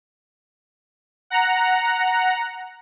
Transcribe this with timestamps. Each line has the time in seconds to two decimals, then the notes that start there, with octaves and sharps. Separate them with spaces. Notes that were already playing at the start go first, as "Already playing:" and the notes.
1.30 F#5 A#5